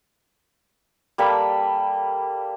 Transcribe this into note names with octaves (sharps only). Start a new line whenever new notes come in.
G3 A#3 A4 B5